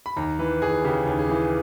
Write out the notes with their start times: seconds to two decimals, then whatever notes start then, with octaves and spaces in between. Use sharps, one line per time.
0.06 B5
0.17 D#2 A#5
0.39 E3 B4
0.62 D#2 G#4
0.85 C#3 G4
1.07 D#2
1.19 G#4
1.30 E3